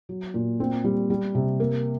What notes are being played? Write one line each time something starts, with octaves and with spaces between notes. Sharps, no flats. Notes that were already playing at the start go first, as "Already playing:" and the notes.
F#3
A#2
C4
G3
G3
C3
A#3